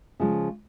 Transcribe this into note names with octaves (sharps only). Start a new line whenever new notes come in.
C#3 F3 G#3